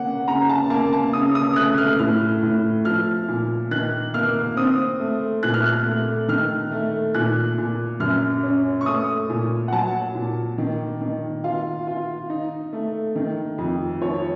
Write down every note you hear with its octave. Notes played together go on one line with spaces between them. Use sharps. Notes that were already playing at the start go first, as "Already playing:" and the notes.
Already playing: A#3 C#4 F#5
C#3 A#5
A5
A#3 A5
A5
C#3 D#6
D#6
A3 F#6
F6
A2 F6
A2
F3 F6
A#2
D#3 F#6
A#3 F6
C4 D#6
A3
A#2 F#6
F6
F#6
A3
D#3 F6
A3
A#2 F#6
A#2
F#2 F6
C#4
C#6
A3 D#6
A#2
F#5
F#3 A5
A#2
D#3
D#3
F4 F5
F4
D#4
A3
D#3
F2
F3 C#5